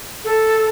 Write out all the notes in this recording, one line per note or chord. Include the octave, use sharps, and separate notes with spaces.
A4